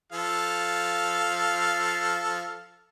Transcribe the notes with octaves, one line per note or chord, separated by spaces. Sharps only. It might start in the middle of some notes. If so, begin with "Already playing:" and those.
F3 A4 F5